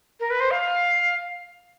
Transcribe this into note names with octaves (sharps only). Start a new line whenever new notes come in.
A#4
B4
C5
F5